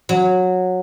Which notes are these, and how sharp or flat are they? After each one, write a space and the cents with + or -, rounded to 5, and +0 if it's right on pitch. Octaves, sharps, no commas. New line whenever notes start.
F#3 -15